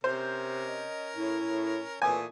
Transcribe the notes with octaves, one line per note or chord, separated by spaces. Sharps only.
C3 C#4 A#4 C5
D#5
A2 E4
A2
A#2 E3 A3 B4 G#5 D#6